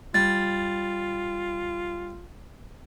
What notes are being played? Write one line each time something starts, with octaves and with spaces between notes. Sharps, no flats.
G3 F4 A6